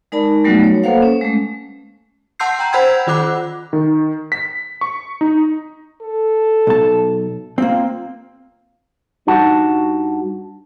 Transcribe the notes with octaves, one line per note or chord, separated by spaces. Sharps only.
G#3 D#4 A#4 D5 A5 B5
F#3 G3 A3 B3 D#4 F#4
C#5
A#3 A4 B4 C5 F5 F#5
C#4
G#3 A3
F#5 A5 C6 E6 G6 C7
G5 A#5
C5 F#5 B5 E6 G6 G#6
D#3 F4 F#5 D6 F#6
D#3
B6
C#6
D#4
A4
B1 A5
A#3 C4 F4
G2 D#4 F#4 F#5 A5